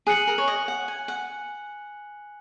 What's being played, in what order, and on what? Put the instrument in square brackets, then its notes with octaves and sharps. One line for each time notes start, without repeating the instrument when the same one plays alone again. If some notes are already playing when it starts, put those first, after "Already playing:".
[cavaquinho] G#4 [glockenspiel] G#5 F#6 C#7 F#7
[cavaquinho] A#4
C#5
D#5
F#5
G#5
F#5